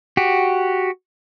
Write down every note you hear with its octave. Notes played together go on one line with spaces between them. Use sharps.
F#4 G4